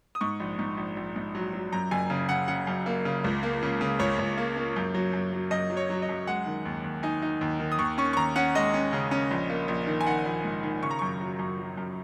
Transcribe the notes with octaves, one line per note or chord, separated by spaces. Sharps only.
D#6
G#2 C#6
A#1
G#2
A#1
A#1
G#2
F#3
F#3
F#2 A#5
F#1 G#5
C#3
C#3 F#5
C#3 F#5
F#2
A#3
C#3
C#2
A#3
C#3
C#3
C#2 C#5
C#2
A#3
A#3
F#2
F#3
F#2
F#3
F#2 D#5
F#3
C#5
F#3
D#5
F#2
G#3 F#5
D#3
D#2
D#2
D#4 G#5
D#4
D#2
D#3
D#6
D#2 C#6
C#4 C#6
C#6
D#2 A#5
C#4 F#5
G#3 D#5
C#4
C#3
C#4
A#1
A#3
A#1
D#3
G#5
D#3 F#5
A#1
G#2
D#3
C#3 C#6
A#5
F#2 C#6
F#3
F#2
F#3
F#2